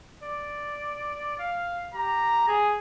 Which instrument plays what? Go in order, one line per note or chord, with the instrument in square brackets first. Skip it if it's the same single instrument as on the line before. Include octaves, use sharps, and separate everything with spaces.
[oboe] D5
F5
[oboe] G4 [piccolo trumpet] A#5
[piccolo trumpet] G#4